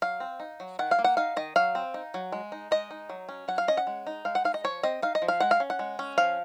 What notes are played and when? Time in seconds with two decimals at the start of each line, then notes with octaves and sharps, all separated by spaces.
0.02 F#3 F5
0.20 C4
0.40 D#4
0.60 F#3
0.79 D#3 F#5
0.91 F5
0.99 A#3
1.04 F#5
1.17 D#4 F5
1.36 D#3 D#5
1.56 F#3 F5
1.75 C4
1.94 D#4
2.14 F#3
2.32 G#3
2.52 D#4
2.71 G#3 D#5
2.91 D#4
3.10 F#3
3.29 C#4
3.48 F#3 F#5
3.58 F5
3.68 C#4 D#5
3.77 F#5
3.87 G#3
4.07 D#4
4.25 G#3 F5
4.35 F#5
4.44 D#4 F5
4.54 D#5
4.64 F3 C#5
4.83 C4 D#5
5.02 D#4 F5
5.15 D#5
5.22 F3
5.28 F5
5.40 G#3 F#5
5.51 F5
5.60 C#4
5.70 F#5
5.79 G#3
5.99 C#4
6.18 F3 F5